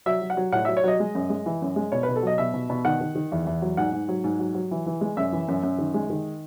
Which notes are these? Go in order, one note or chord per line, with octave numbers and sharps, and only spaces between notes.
F#3 E5
F#3
F#5
F#3
A2 F#5
F#3 E5
C#5
F#3 D#5
G#3
F#2
G#3
E3
F#2
G#3
B2 C#5
B4
B2
A4
F#3 D#5
B2 E5
B2
B2
D#3 F#5
D#3
D#3
E2
E2
F#3
G#2 F#5
G#2
F#3
G#2
F#3
F#3
E3
E3
G#3
F#2 E5
E3
F#2
F#2
D#3
G#3
D#3